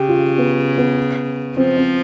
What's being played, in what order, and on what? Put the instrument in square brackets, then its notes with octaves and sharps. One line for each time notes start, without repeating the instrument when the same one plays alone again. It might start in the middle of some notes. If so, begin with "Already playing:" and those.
Already playing: [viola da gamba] C#3 [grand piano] G4
[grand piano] F4
B3
B3
[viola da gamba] F3 [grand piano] C4
[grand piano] C4